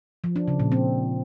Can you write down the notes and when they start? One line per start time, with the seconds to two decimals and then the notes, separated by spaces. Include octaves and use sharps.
0.24 F3
0.36 D4
0.48 C#3
0.60 A#2
0.72 C4